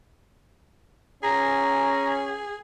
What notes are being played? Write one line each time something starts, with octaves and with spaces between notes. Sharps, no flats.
C#4 G#4 A#5